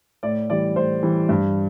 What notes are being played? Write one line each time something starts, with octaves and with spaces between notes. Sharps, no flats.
A2 D5
E3 G3 D5
A2 C5
E3 G3
G2